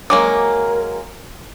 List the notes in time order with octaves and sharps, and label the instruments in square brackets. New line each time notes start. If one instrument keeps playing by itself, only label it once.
[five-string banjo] F#3 G#3 A#3 [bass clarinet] A#4 [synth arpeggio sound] D6